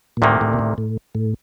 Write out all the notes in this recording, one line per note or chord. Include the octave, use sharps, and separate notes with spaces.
A#2
D2 A2 C3 D#3 A#3
A2
A#2
A2
A2
A2